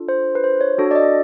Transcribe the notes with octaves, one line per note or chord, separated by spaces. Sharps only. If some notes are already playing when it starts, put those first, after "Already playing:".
Already playing: D4 F4 A4
C5
B4
C5
C#5
D4 F#4 A4
D5
D#5